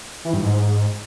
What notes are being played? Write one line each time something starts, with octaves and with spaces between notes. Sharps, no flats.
E3
G2
G#2